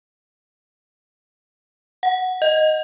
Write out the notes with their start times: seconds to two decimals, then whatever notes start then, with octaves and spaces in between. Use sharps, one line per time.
2.03 F#5
2.42 D#5